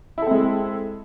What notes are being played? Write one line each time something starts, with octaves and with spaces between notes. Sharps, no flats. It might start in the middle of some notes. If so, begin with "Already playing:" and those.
G#3 C4 E4 A4